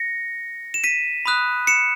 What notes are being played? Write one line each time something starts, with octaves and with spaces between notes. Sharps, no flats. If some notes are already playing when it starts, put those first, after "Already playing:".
Already playing: A#6 C#7
E7
B6 D#7
B5 D#6 F#6
C#7 E7